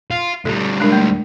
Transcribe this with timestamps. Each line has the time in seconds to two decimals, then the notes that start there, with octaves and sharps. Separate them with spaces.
0.11 F4
0.45 D2 G3 A4
0.80 G#3 D4 A#4
0.92 A3